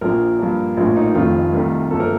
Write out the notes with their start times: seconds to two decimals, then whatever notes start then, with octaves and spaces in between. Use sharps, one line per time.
0.01 A#1 A#2 F3 A#3 A#4
0.39 G2 F3 A#3
0.77 A#1 A2 F3 A#3
0.96 D#4
1.15 F1 F2 D#3 A3 F4
1.53 C2 C3 D#3 A3
1.91 G1 G2 F3 A#3 A4
2.00 A#4